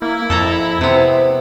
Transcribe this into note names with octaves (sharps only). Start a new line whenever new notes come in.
A#3 E4
F2 A4 A5 A#5
C3 B3 C4